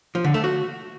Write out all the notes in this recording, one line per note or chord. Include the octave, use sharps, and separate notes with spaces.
F3
D3
A3
F#4